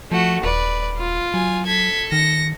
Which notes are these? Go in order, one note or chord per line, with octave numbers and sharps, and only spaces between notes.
F3 A3 F#4
D#1 B4 D5
F4
F#3 G#5
A4 G#6 B6
D#3 A#6 C#7